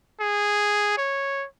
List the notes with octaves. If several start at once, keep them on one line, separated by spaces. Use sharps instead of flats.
G#4
C#5